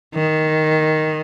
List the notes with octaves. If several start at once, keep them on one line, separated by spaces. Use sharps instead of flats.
D#3